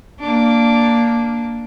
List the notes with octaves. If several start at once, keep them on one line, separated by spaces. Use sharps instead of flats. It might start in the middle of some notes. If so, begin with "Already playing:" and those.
A#3 D4